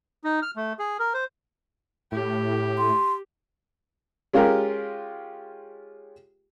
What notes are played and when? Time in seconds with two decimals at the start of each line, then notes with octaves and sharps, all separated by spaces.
0.24 D#4
0.42 F6
0.56 A3
0.79 G#4
0.99 A#4
1.14 C5
2.12 A2 G4
2.78 C6
4.33 G#3 C#4 F4 G4 A#4